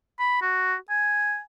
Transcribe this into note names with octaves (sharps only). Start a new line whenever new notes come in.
B5
F#4
G#5